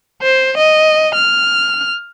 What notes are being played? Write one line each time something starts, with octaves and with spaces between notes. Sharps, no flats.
C5
D#5
F6